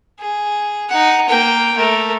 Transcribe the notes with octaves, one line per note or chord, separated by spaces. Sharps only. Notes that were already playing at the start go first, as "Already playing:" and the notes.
G#4
D#4 F#5
A#3 G5
A3 A#4